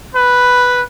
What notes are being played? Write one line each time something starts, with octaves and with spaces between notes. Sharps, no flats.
B4